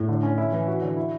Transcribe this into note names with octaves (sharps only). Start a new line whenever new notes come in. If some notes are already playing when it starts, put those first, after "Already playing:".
Already playing: A2
D3
C#4
E4
E3
F#4
D3
E4